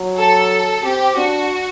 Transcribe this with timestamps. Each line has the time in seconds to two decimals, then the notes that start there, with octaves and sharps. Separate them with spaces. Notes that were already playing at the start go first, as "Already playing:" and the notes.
Already playing: F#3
0.17 A4
0.84 C4 G4
1.17 D4 F#4